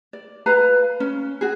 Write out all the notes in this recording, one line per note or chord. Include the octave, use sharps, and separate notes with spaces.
D5
B4 F5 A#5
C#4
F#4 G#4